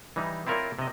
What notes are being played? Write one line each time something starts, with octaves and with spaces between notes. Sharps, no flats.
E3 G3 D#4
C4 E4 F4 A#4 C#5 D5
C3 D#5